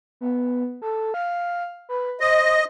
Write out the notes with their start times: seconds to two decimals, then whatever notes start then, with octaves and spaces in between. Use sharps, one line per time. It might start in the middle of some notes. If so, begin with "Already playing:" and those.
0.21 B3
0.82 A4
1.14 F5
1.89 B4
2.20 C5 D#5